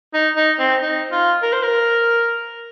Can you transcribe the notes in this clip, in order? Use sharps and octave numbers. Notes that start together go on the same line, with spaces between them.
D#4
D#4
C4
D#4
F4
A#4
C5
A#4